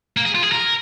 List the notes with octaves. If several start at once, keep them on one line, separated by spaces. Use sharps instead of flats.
A#3
G#4
F4
G#4
A#4